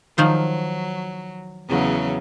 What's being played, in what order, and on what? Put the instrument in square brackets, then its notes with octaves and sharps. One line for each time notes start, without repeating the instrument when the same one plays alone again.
[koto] D#3 F3 C5 [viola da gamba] F#3
[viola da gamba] E2 C#3 F#3